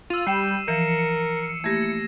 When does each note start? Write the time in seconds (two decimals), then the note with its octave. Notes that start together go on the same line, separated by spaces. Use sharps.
0.10 F4 E6 D#7
0.27 G3 G5 C7 E7
0.68 E3 F3 A#4 C#7 E7
1.64 A3 A#3 E4 G4 G#6 A#6